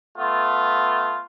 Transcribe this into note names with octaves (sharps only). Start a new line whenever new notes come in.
A3 B3 F4